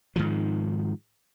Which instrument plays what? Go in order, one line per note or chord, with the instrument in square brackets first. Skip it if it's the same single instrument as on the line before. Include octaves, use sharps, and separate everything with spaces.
[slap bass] G#2 D#3 F3